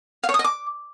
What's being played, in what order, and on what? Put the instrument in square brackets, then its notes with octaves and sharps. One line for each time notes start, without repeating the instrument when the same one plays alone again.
[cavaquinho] F5
C#5
D#6
D#5
D6